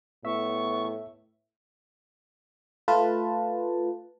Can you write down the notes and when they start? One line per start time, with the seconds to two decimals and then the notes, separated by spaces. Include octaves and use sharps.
0.25 A2 B3 E5 C#6
2.88 A3 F4 B4 A5